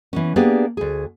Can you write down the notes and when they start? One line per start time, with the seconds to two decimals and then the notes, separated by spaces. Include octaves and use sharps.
0.13 E3 B3 C#4
0.36 A#3 B3 D4 G4 G#4 D5
0.77 D2 G#4